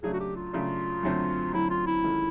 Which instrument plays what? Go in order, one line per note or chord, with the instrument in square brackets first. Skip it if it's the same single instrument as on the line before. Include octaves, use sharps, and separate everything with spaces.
[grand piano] C#3 F#3 A3 D4 [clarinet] G#4
[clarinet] F#4
G4
F4
[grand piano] C#3 F#3 A3 D4
F#2 D3 F#3 A3 C4
[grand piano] F#2 D3 F#3 A3 C4 [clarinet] E4
[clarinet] F4
E4
[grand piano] D#3 G#3 C#4 F4 A4